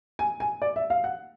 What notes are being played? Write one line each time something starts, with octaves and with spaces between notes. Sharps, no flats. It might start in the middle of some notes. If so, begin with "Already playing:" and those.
G#5
G#5
D5
E5
F5
F#5